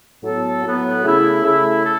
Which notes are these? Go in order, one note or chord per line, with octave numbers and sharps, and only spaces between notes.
A2 F#3 B3 A4
A2 F#3 B3 A4
C#3 A3 E4
C#3 A3 E4
A4